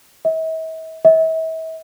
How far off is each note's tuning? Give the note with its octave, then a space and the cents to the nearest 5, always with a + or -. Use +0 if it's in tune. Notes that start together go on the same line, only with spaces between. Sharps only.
E5 -45
E5 -40